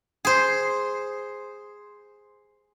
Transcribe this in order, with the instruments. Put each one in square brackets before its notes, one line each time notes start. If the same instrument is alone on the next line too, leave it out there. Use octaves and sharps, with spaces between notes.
[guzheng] G#4 C5